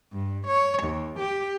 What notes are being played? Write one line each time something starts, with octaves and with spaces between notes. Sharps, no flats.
G2
C#5
D#2
G4